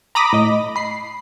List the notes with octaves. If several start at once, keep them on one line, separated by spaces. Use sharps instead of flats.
A#5 B5 D6 D#6 A#6
A2 D#5
B5 C7